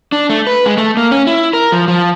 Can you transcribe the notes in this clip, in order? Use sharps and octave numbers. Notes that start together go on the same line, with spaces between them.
D4
A3
B4
G#3
A3
A#3
C#4
E4
A#4
F3
F3